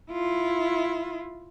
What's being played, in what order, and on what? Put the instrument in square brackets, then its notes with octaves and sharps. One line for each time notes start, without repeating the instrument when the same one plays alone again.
[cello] E4 F4